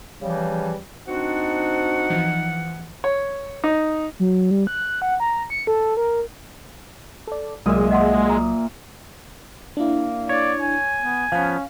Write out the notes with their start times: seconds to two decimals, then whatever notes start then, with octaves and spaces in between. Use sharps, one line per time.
0.22 C#3 E3 F3 G3
1.08 C4 D4 D#4 F#4 F#5
2.10 E3 F3
3.04 C#5
3.64 D#4
4.20 F#3
4.51 G3
4.67 F#6
5.02 F#5
5.20 A#5
5.50 C#7
5.67 A4
5.97 A#4
7.27 A4 D5
7.66 C2 A#2 F#3 G#3 E5 D#6
7.91 D#5 F#5 C6
8.30 A#5
9.77 A#3 D4 E4
10.29 C#5 D5
10.61 G#5
10.99 B3
11.32 F3 B3 C#4 F5